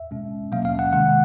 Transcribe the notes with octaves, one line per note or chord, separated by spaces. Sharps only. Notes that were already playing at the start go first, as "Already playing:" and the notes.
Already playing: E5
B2 G#3 C#4
B2 F#3 A#3 C#4 F5
F5
F#5
C3 D#3 G#3 F#5